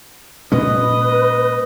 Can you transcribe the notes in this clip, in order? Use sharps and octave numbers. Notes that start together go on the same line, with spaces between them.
A#2 G#3 C#4 B4 D#5